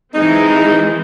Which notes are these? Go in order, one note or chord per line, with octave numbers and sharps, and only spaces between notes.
E3 G#3 C4 D#4